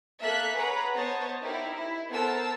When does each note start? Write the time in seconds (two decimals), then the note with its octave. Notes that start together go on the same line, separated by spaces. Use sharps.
0.22 A#3 A4 E5 F#6 B6
0.56 G#4 B4 C#5 F#5 A#5 B5
0.96 B3 C5 C#5 D#5 A5
1.41 D#4 E4 G4 A#4
1.75 E4
2.09 B3 A4 A#4 C5 A5 E6